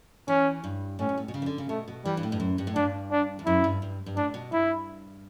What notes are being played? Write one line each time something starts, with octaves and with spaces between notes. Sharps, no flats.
E3 C#4
G2
A2 C#4
B2
A2
B2
C#3
E3
D3
C#3
B2 A3
B2
E3 G3
G2
A2
G2
F#2
G2
A2
G2 D4
D4
E2
F#2 E4
G2
G2
G2
A2 D4
B2
G2 E4